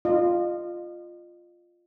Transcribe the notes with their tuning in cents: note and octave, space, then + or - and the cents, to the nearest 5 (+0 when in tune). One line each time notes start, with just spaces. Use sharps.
F4 +0 D#5 -35